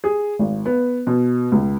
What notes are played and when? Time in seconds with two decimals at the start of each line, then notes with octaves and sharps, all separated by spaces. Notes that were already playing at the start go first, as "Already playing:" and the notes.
0.04 G#4
0.39 G#1
0.66 B3
1.07 B2
1.52 C#2